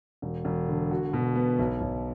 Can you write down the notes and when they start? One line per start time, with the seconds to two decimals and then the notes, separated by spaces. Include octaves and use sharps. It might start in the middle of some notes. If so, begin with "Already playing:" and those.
0.22 E1
0.45 E1
0.68 D3
0.91 F#4
1.13 B2
1.35 B3
1.59 B1
1.81 B1